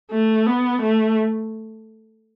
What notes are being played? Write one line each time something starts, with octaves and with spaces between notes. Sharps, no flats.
A3
B3
A3